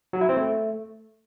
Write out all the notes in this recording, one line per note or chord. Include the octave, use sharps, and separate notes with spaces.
F#3
E4
C4
A3